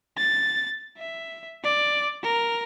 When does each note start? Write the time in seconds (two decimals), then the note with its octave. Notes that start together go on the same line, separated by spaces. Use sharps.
0.18 A6
0.98 E5
1.64 D5
2.23 A#4